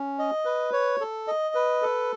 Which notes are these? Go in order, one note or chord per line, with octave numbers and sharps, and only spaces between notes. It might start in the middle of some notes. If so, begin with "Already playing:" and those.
Already playing: C#4
D#5
B4
C#5
A4
D#5
B4
A4